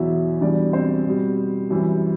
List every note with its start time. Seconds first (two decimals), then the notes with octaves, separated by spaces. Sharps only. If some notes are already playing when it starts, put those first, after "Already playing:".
Already playing: E2 B2 F#3 E4 E5
0.41 E2 B2 G3 D4 D5
0.73 C4 C5
1.06 B2 G3
1.70 F#2 E3 G3